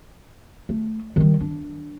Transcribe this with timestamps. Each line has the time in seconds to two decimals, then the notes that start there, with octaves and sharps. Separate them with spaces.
0.69 A3
1.16 D#3 G3
1.40 D4